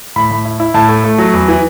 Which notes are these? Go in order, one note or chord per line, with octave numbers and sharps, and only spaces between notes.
A2 B5
A2
E4
E4
A2 A5
A3
A3
F#3
E2
E3